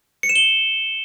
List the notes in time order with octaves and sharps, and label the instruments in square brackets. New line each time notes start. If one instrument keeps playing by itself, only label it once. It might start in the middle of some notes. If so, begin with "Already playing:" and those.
[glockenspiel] C#7
E7
G7